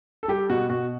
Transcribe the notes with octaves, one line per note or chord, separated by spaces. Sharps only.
A4
G3 G4
B2 F#4
B2 F#4